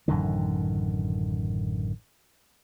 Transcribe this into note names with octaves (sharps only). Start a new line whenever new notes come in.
A1 F#2 D3 D#3